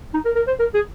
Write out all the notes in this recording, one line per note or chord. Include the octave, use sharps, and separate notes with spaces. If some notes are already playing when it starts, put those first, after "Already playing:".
D#4
A#4
A#4
C5
A#4
G#4